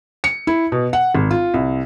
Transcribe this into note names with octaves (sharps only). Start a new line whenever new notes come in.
C#7
E4
B2
F#5
G#1
F4
C2